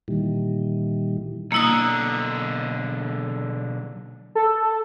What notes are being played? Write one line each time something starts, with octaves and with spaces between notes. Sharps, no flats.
A#2 D#3 E3 G3
B1 D3 A#3 E4 D#6
A4